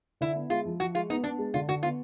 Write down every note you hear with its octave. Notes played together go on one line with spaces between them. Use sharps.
D3 E4
B3
G#3 F4
F3
F3 F#4
G#3 F4
B3 D#4
B3 D4
G#3
D3 F4
D3 F#4
B3 F4